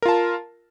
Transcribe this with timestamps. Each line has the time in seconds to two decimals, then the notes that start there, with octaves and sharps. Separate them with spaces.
0.02 A#4
0.05 F4
0.09 A5